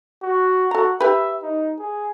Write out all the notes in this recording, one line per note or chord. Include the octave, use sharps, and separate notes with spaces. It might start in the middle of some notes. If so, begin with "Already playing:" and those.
F#4
F#4 A4 A#5
G4 B4 E5
D#4
G#4